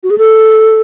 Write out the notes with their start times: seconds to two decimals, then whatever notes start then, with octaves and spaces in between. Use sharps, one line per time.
0.03 F#4
0.10 G#4
0.18 A4